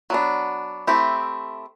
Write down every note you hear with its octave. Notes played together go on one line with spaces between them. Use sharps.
F#3 B3 D4
A3 C4 E4 G4